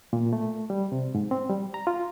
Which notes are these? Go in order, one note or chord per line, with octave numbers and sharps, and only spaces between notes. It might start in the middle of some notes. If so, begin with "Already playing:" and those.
A#2
A3
G3
C3
G#2
C4
G3
A#5
F4